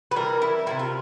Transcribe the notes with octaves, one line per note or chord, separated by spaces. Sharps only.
B4
C3 E3 G3 A#4
E4
C3 E3 G3 E4
F4